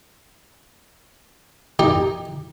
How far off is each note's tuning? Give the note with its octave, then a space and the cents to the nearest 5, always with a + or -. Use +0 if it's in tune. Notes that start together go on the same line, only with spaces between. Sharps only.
D#4 +0 G4 +15